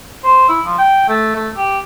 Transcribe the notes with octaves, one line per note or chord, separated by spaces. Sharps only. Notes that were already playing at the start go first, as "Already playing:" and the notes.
C5
E4
F3
G5
A3
A3
G4